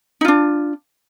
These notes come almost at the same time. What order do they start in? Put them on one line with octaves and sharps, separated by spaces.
D#4 F4 D4